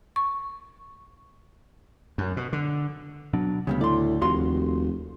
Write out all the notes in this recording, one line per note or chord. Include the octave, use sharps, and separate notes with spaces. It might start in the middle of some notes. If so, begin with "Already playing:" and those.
C#6
F#2
B2
D3
B2 F#3 D4
D2 C#3 G3 B3
A2 D5 C6
F1 D#2 F#4 F5 C6